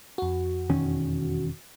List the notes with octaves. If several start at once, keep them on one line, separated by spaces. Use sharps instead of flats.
F2 F#4
E1 D#3 C#4